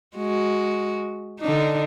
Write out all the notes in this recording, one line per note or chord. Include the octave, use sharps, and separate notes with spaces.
G#3 F#4
D3 D4 D#4